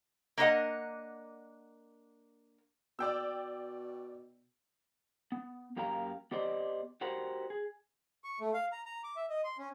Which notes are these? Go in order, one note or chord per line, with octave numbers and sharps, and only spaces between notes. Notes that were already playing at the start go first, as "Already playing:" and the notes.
A#3 D4 A#4 B4 D#5 F#5
B2 D5 G5 E6
B3
F#2 A#3 G4 A#4 F5 A#5
B3 G4 C5 D5 D#5
F#4 G4 A#4 C5 F#5
G#4
C#6
A3
F5
A#5
A#5
D6
E5
D#5
C6
C#4